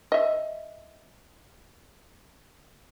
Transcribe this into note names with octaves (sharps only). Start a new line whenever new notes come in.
D#5 E5